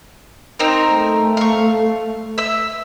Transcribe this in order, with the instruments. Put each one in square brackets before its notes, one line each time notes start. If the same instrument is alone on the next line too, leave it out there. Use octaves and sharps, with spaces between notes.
[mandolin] C4 D#4 A#4
[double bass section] A3
[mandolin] F5 C#6
E5 E6